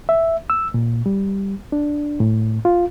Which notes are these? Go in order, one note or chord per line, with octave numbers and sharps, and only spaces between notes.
E5
E6
A#2
G3
D4
A2
F4